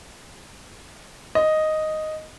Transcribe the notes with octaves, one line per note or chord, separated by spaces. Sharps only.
D#5